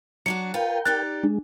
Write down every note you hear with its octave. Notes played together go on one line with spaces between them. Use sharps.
F#3 D4 F#4 C#7
F4 A#4 B4 G5
D#4 G4 D5 F#6 A6
G#3 D4